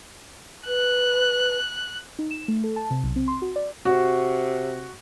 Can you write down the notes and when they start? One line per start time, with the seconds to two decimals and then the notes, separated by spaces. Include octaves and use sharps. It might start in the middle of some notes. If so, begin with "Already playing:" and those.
0.67 B4 F#6
2.19 D#4
2.31 E7
2.48 A3
2.64 A4
2.76 A5
2.90 C3
3.03 B1
3.16 C4
3.28 C6
3.42 F#4
3.56 D5
3.85 C3 F#4